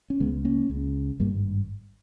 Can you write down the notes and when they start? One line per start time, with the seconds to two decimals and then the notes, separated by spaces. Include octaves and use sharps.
0.10 C#4
0.20 C#2 C#3 G#3 B3
0.45 A#3 C#4
0.70 C#2 C#3
1.19 G#1 G2 G3 A#3